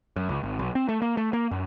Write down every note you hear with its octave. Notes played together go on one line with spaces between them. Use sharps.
F#2
C#2
G#1
B1
C4
A3
A#3
A3
A#3
F#2